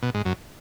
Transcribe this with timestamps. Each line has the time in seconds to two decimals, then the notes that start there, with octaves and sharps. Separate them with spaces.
0.03 B2
0.14 G#2
0.25 F#2